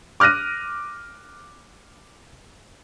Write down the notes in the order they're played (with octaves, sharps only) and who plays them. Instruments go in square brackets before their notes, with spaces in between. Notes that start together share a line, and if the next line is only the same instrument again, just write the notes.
[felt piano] D6 F6 F#6 A#6 D#7